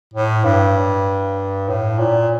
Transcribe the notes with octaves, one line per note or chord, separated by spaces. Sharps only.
A2
G2
A2
A#2